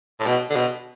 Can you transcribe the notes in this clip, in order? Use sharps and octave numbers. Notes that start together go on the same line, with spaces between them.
A2
B2
D3
B2